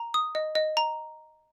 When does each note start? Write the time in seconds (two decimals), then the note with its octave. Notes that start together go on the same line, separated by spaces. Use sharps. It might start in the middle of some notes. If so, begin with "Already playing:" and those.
Already playing: A#5
0.14 D#6
0.35 D#5
0.55 D#5
0.77 A#5